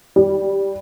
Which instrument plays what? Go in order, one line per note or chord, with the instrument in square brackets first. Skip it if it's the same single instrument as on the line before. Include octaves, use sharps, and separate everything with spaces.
[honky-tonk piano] G3